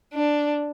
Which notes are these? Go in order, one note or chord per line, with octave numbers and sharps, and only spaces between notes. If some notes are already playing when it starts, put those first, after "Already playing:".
D4